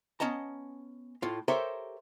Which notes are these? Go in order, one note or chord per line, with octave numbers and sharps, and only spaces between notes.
B3 C#4 D#5 A5 A#5
A2 F4
G4 A4 A#4 C5 C#5 E5